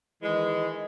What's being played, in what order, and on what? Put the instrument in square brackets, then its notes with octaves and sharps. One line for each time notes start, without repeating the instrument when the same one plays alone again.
[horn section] D#3 E3 G#3